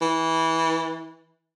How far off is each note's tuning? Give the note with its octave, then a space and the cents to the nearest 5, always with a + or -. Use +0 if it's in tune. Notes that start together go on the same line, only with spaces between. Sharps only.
E3 -20